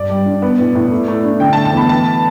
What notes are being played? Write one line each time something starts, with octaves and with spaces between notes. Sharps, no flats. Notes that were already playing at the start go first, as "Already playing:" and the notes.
Already playing: G2 D4 D5
G3
D4
B3
A2
A2
A3
A3
D4
D3 G5
A5
A3
A5
E2 B5
B3 A5